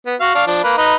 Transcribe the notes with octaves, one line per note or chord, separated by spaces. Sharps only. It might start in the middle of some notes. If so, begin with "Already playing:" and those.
B3
F#4 F5
D4 F5 C#6
F3 D4
A#3 B4
D#4 B4